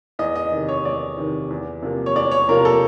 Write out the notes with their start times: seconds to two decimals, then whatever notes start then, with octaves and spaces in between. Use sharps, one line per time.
0.19 E2 D#5
0.35 D#5
0.52 C3 D#3
0.69 C#5
0.85 E2 D5
1.18 C3 D#3
1.50 E2
1.82 C3 F3 A#3
2.06 C#5
2.15 E2 D5
2.31 C#5
2.48 C3 F3 A#3 A#4
2.65 A4